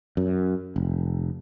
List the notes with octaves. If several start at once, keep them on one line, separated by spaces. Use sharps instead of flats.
F#2
F1